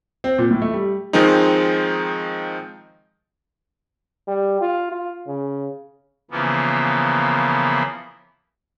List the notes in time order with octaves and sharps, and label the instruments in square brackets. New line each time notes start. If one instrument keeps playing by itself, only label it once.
[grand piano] C4
A#2
A2
A3
G3
[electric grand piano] D#3 F3 G#3 C4 D#4
[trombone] G3
F4
F4
C#3
[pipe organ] C#3 E3 F3 A#3 B3